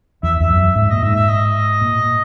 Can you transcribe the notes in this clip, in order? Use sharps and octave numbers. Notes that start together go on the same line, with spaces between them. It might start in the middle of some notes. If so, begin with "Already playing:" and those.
E2 E5
E2 E5
F#2
G#2 E5
A#2 D#5
G#2 E5
E5
D#5
A#2